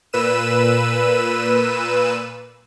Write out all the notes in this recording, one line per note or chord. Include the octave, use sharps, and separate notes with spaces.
A#2 B4 E6 D#7 E7